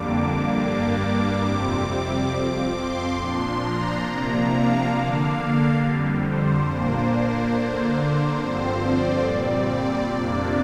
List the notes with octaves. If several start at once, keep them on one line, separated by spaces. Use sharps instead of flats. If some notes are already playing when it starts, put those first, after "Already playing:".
Already playing: F2 D3 G3 A#3 D4 D6
D6
G2 G3 A#3 D4 D6
F2 C3 G3 C4 D6
F2 F3 C4
C6
A#2 F3 D4 C6
A#5
C3 F3 A#3 D4
F5
D3 A#3 D4
F2 D3 G3
C5
A#2 A#3 D4
D3 A#3 D4
G2 D3 F3 C4 C5
D5
A#2 G3 C4
D5
F2 C3 A#3 D4